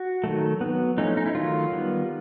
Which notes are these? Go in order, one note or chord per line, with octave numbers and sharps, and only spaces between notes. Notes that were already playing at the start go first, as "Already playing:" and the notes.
Already playing: F#4
D#3 F#3 A3
F#3 B3
F3 A3 C#4 D#4
D#4
E4
D#3 F#3 A3 F4
D#3 G3 B3